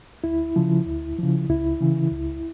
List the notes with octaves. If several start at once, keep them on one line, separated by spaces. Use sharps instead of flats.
D2 E4
C#3 F3
D2
C#3 F3
C#2 E4
C#3 E3
C#2